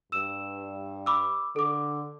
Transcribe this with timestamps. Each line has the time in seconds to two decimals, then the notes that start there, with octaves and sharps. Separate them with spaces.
0.12 G2 E6 E7
1.06 B5 D6 E6
1.56 D3 A4 D6